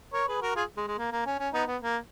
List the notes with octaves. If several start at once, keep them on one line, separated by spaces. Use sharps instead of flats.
A#4 C#5
G#4 B4
F#4 A#4
F4 G#4
G#3
G#3
A#3
A#3
C#4
C#4
B3 D#4
B3
A#3